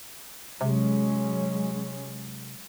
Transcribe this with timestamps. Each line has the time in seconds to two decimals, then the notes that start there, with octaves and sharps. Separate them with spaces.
0.61 C3 F#3 G#3 C#4